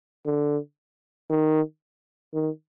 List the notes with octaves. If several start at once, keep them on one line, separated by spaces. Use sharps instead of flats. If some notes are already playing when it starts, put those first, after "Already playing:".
D3
D#3
D#3